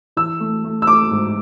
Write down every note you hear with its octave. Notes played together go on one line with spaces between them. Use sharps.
E3 E6
A3
A3
E6
A3 D6
G#2